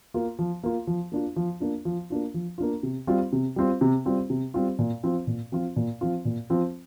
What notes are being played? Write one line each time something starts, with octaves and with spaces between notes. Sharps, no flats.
A#3 F4
F3
A#3 F4
F3
A#3 D4 F4
F3
A#3 D4 F4
F3
A#3 D4 F4
F3
A#3 D4 F4
C3
G3 C4 F4
C3
G3 C4 F4
C3
G3 C4 F4
C3
G3 C4 F4
A#2
F3 C4 F4
A#2
F3 C4 F4
A#2
F3 C4 F4
A#2
F3 C4 F4